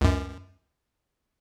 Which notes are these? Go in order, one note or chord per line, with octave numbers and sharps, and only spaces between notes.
C#2 F#2